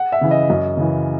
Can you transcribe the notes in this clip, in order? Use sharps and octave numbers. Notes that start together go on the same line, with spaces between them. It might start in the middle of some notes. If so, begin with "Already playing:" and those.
Already playing: F#5
E5
C#3 E3
D#5
F#2
C#3 E3